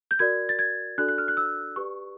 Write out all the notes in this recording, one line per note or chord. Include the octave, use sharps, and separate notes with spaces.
G6
F#4 A#4 D5 G#6
A6
G#6
D4 F#4 A4 D5 F#6
F#6
F6
F#6
E6
G4 B4 D5 C#6